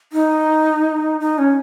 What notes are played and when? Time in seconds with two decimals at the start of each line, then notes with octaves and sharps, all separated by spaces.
0.13 D#4
1.20 D#4
1.38 C#4